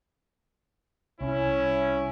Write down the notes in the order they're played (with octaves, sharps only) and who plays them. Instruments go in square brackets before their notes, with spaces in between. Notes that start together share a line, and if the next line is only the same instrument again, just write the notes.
[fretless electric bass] C2 [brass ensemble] C#4 E4